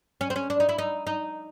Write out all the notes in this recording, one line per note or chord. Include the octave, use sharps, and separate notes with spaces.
C#4
C4
C#4
D4
D#4
E4
D#4
D#4